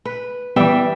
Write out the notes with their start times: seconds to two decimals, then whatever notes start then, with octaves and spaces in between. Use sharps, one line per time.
0.05 B4
0.56 E3 G3 B3 E5 G5